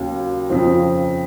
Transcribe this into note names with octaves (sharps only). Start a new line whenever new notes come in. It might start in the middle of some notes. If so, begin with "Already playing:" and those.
Already playing: D#2 C#3 F#3
F2 C#3 F3 C4